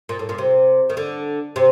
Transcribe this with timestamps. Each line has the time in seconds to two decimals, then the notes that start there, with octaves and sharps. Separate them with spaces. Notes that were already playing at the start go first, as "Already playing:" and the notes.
0.09 A#2
0.19 A2
0.29 A#2
0.38 C3
0.90 D#3
0.97 D3
1.56 C3